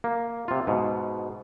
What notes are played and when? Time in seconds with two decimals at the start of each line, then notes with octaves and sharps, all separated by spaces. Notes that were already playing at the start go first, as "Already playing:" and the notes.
0.04 A#3
0.48 C3 F4
0.67 G#2 B2